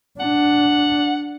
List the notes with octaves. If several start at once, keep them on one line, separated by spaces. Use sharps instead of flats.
D4 F#5